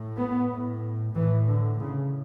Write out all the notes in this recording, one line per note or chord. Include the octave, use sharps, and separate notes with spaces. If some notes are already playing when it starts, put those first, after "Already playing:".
Already playing: A2
B3
A2
A2 E3
D3
A2 C#3